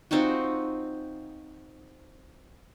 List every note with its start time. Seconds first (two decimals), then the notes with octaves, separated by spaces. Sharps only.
0.11 C4 D#4 F4 F#4